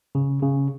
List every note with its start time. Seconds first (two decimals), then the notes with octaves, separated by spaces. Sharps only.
0.15 C#3
0.42 C#3